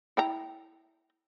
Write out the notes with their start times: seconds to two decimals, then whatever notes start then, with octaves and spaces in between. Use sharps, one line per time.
0.17 E4 G5 A#5